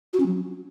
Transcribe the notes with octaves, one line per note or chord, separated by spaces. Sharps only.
F#4
C#4
F#3